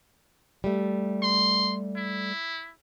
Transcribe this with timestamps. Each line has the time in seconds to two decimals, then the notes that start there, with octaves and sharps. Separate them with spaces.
0.64 G3 A3
1.23 C6
1.96 E4